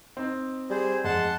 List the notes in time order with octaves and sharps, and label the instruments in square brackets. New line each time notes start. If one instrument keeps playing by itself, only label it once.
[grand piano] C4 D#4
[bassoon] G3 [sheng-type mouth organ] G#4 C5
[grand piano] F2 [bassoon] G#3 [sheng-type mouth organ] F#5 A5 C6